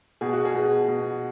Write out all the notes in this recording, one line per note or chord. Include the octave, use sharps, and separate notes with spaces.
B2 G#4
F#4
G#4
B2
B2